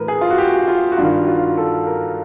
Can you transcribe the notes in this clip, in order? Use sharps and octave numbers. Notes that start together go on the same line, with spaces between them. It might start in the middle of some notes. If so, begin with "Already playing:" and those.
Already playing: A2 E3 A#4 B4
G#4
F4
F#4
G4
F4
F#4
G2 D#3 F4
F#4
F4
A#4
A4
A#4